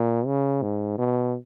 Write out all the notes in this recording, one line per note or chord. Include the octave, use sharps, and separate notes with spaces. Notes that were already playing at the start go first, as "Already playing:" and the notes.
Already playing: A#2
C#3
G#2
B2